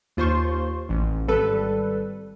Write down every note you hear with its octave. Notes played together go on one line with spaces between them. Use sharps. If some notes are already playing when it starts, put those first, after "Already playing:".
D#2 F4 C5 C6 C#6
A1
G#1 G3 A4 B4